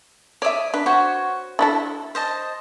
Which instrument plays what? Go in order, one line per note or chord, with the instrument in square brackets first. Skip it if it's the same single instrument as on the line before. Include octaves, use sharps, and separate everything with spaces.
[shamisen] C#5 E5 [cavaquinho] D5 D#6
[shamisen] D4 [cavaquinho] B4
[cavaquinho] F#4 C5 C#5
[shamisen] D4 E4 A4
[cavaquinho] C5 D#5 A5